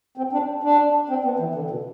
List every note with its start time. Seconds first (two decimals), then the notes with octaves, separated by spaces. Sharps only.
0.17 C4
0.33 D4
0.64 D4
1.09 C4
1.24 B3
1.39 E3
1.55 D3
1.70 B2